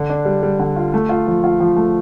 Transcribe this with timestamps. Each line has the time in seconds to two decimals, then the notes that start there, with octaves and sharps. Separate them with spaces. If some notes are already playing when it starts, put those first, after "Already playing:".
Already playing: D3
0.10 D4
0.25 G3
0.43 G3
0.59 D3
0.76 F4
0.94 A3
1.09 F4
1.27 F3
1.44 F4
1.60 F3
1.76 A3